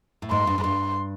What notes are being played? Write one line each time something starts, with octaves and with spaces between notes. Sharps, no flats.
A2
G#2 C6
G2
G#2
G2 C6